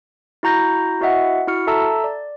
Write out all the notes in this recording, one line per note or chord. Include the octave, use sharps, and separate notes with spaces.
E4 F#4 A#5 G6 A#6
E4 F#4 D#5 E5 F#5
E4 F#4 F6 C#7
A4 E5 A5 A#5 E6
D5